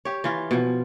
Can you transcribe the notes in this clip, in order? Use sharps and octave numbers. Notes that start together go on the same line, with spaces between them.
G4 C#5
E3 F4
B2 F3